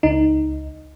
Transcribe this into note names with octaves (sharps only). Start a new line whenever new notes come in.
C#2 D#4